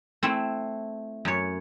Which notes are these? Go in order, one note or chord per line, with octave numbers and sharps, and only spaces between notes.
A3 C4 E4
F#2 C#5